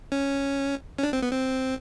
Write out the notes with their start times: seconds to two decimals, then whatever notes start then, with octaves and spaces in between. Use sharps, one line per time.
0.12 C#4
0.98 C#4
1.03 D4
1.13 C4
1.22 B3
1.33 C4